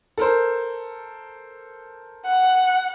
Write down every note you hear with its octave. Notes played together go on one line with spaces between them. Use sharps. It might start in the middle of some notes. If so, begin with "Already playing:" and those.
A4 A#4 C5
F#5